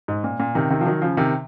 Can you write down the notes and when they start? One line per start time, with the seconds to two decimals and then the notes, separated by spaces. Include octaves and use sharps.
0.08 G#2
0.24 A#2
0.40 A#2
0.55 C3 D#3
0.70 C3 D#3
0.81 F3
0.86 D#3 F#3
1.02 C#3 F3
1.17 C3 D#3